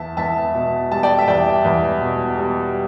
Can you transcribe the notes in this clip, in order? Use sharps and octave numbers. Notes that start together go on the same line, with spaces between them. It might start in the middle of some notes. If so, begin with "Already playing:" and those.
Already playing: E2 E5 A5
E2 E5 A5
B2
G3 A5
D5 G5
E5
E2 D5 G5
E2
B2
G3